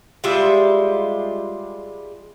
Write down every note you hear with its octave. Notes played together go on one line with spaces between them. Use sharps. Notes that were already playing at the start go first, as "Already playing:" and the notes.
G3 G#3 F4 E5